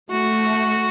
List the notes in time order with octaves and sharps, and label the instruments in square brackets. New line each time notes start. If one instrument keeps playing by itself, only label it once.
[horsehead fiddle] A3 [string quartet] F#4